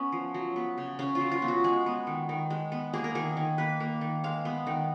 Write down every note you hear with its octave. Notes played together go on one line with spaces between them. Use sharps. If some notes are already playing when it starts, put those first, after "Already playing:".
Already playing: B3 C#4
F3
F#3
B3
C#3
C#3 C#4
F4
F#3
F4
B3
F#4
G#3 G#4
B3
D#3
D#3
G#3
B3
A#3 G#4
A#4
D#3 G#4
D#3
A#3 B4
A#3
D#3
G#3 F5
B3
D#3